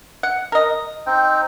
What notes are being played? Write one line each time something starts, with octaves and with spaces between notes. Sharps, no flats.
F#5
A#4 D#5
C4 D#4 G5